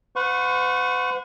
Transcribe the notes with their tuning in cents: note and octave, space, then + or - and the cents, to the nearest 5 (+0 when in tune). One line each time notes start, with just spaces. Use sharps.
B4 +45 F#5 -30 C#6 -15